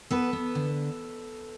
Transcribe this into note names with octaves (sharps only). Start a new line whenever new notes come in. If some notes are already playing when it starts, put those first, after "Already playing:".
B3 A4 B4
B3
D3